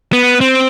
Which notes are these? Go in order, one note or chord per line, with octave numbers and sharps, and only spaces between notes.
B3
C4